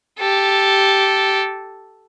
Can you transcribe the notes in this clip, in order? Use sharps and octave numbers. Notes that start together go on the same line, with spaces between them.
G4 A4